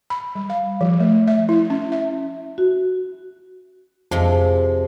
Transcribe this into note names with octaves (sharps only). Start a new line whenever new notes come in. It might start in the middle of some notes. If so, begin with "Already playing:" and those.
B5
G3
F5
F3
A3
E5
E4
C#4
E5
F#4
F2 C3 F3 G#3